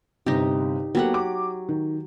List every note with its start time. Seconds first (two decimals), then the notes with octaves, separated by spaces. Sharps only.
0.26 G1 C3 D#4 G4
0.95 F#3 A#3 B3 G4 A4 F#5
1.14 D6
1.69 D#3